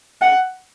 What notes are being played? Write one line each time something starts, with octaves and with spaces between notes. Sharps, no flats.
F#5